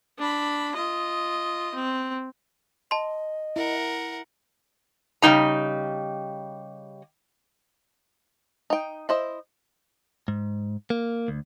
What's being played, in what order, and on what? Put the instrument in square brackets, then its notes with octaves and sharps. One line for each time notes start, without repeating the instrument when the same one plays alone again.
[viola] D4 B5
F4 D#5
C4
[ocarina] D#5 [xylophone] A5 C6
[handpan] E4 [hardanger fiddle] A#4 F#5
[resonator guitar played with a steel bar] C#3 G3 D#4 A#5
[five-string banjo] D#4 G5
E4 C5 D#5
[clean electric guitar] G#2
A#3
D2